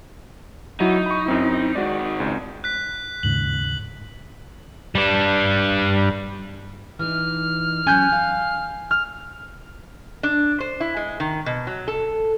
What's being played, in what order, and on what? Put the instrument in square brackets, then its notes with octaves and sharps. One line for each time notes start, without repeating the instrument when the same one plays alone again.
[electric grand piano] F#3 E4 F#4 [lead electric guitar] D#4
[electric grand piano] B5 C#6
F#2 C4 E4
[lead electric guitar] G#2 D#3 [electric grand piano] F#4 D5
[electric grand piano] C#2
[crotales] F#6 B6
[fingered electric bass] D#2 G#2 C#3 [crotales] F#7
[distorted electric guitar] G3 D4
[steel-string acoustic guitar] E3 D#4 [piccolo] F6
[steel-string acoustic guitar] F#3 C#4 [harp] G#5 F#6 G6
[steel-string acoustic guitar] F5
[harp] F6
[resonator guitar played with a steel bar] D4
C5
E4
G#3
D#3
B2
F#3
A4